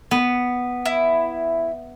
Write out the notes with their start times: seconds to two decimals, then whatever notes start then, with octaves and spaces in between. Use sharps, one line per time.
0.11 B3
0.85 E4